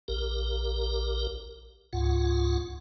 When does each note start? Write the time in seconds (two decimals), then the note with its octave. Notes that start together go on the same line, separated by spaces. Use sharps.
0.08 A#1 G4 A#4
1.93 C#2 G#2 F4 F#5